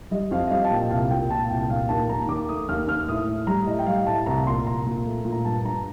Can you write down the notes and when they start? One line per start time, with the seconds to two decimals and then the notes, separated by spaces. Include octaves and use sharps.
0.11 G3 D#5
0.31 F2 F5
0.47 D#5
0.51 G3 F5
0.65 A5
0.70 A#2 G5
0.91 C2 F5
1.11 A#2 G5
1.31 A#2 A5
1.50 C2 G5
1.70 A#2 F5
1.89 D#2 A5
2.09 D#2 A#5
2.28 D#2 D6
2.49 A3 D#6
2.69 D#2 F6
2.88 D#2 F6
3.08 A2 D#6
3.27 A2
3.47 G3 A#5
3.67 A2 D#5
3.79 G5
3.86 G3 F5
4.06 A2 A5
4.26 C2 A#5
4.47 A#2 C6
4.66 C2 A#5
4.86 A#2
5.06 A3
5.25 A#2
5.32 A#5
5.45 G2 A5
5.64 G2 A#5